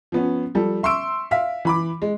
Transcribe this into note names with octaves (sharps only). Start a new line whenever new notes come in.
F3 B3 C#4
F3 G3 A4
E5 C6 C#6 E6 D7
E5 F5 B6
E3 B5 D6
G#3